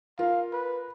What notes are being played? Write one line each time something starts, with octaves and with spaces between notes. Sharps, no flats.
F4 A#4 F5
B4